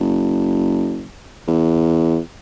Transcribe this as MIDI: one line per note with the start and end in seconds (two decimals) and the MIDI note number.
0.01 1.07 30
1.48 2.19 40